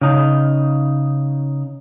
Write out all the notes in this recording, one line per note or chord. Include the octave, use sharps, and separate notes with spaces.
C#3 D#4